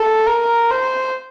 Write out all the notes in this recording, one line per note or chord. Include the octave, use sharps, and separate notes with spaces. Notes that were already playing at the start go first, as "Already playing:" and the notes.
Already playing: A4
A#4
C5